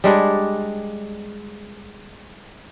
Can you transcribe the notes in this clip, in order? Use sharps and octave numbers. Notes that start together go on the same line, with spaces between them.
G3 G#3 D4